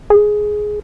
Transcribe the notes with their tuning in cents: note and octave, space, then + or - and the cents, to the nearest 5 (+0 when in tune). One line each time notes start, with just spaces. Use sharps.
G#4 +10